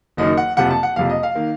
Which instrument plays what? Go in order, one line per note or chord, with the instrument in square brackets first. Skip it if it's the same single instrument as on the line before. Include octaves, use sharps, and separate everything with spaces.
[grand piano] F#1 F#2 D#3 F#3 D#5
F#5
F#1 F2 C3 F3 F#5
A5
F#5
F#1 F2 C3 F5
D#5
F5
D#3 A#3